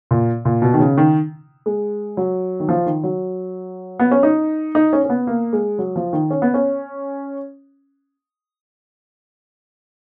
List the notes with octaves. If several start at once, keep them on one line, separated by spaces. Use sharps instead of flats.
A#2
A#2
B2
D#3
C#3
D#3
G#3
F#3
D#3
F3
D#3
F#3
B3
C#4
D#4
D#4
C#4
C#4
B3
A#3
G#3
F#3
F3
D#3
C#4
B3
C#4